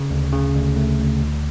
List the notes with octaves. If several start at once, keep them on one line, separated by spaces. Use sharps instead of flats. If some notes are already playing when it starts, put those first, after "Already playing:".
Already playing: C#3
D2
C#3
D2
A3
D2
D2